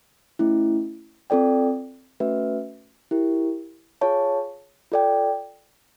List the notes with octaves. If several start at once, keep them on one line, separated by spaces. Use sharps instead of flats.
A3 C#4 E4
C4 F4 A4 D5 G5
A3 C#4 F#4 B4 E5
E4 G4 A#4
F4 G#4 C#5 F5 A5
F4 A4 D5 G5